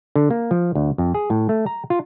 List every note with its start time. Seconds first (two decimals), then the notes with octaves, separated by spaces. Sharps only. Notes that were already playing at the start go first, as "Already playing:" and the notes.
0.16 D3
0.30 A#3
0.51 F3
0.75 D2
0.98 F2
1.14 G#4
1.30 A2
1.49 A3
1.66 A#5
1.90 F4